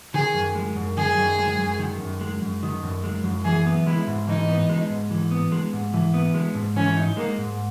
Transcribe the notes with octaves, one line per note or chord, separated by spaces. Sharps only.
D#3 G#4
F#2
G#3
F#2
D#3 G#4
F#2
G#3
F#2
D#3
F#2
G#3
F#2
D#3
F#2
G#3
F#2
E3 G#4
B3
G#3 E4
G#2
E3 D#4
B3
G#3
G#2
E3
B3
G#3
G#2
E3
B3
G#3
G#2
E3 C#4
D#4
G#3 A#3
G#2